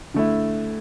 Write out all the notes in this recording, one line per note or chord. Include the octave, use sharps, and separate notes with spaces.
D3 A3 E4